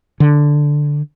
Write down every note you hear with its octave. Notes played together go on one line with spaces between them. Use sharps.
D3